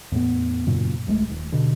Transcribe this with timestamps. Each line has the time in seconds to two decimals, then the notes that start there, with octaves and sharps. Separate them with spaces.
0.12 E2 A2 B3
0.67 F#2 A#2 C#3
1.07 D1 A#1 G#3 A3
1.30 D#1
1.52 B2 D3